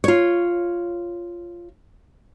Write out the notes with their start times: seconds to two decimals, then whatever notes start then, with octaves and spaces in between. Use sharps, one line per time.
0.04 F4 C#5